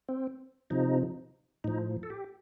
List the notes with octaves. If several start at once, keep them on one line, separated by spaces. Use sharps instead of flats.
C4
C3 F3 D#4
A2 F3 D#4
A4
G4